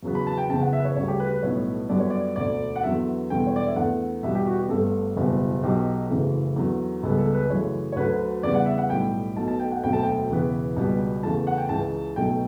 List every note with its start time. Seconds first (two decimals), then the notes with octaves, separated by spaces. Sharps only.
0.03 E2 C#3 F#3 B3
0.15 B5
0.27 A5
0.38 G5
0.49 F#1 E2 C#3 A5
0.61 F#5
0.73 E5
0.80 B4
0.85 C#5
0.96 D2 C#3 G3 C#5
1.08 G4
1.20 B4
1.31 B4
1.43 B1 A2 G3 B3 C#5
1.89 F#2 D3 G3 B3 D5
2.00 C#5
2.10 D5
2.36 E1 D2 D3 D5
2.76 F#5
2.83 E2 D3 F#3 B3 E5
3.30 E1 E2 D3 G3 G5
3.47 C#5
3.56 D5
3.66 E5
3.76 E2 D3 A3 F#5
4.23 E2 B2 G3 B3 E5
4.35 G4
4.47 F#4
4.58 G4
4.69 G1 G2 D3 A3 A4
5.16 F#1 E2 B2 G3
5.63 B1 B2 F#3 G4
6.10 F#1 F#2 C#3 E3 A3
6.56 E2 D3 F#3
7.03 C#2 C#3 G3 B3 A4
7.18 A4
7.34 B4
7.50 F#2 C#3 E3 A3 C#5
7.92 C#5
7.96 D2 D3 F#3 B4
8.43 E2 C#3 G3 B3 D5
8.55 F#5
8.66 E5
8.78 F#5
8.90 B1 A2 G3 G5
9.36 B1 B2 A3 A5
9.48 A5
9.60 G5
9.72 F#5
9.84 E1 D2 D3 F#3 A3 G5
9.93 A5
10.03 G5
10.30 E1 E2 C#3 E3 B3
10.76 C#2 B2 G3 B3
11.23 E2 C#3 E3 A3 A5
11.47 F#5
11.58 G5
11.69 C#2 C#3 E3 A5
12.16 B1 B2 F#3 A3 G5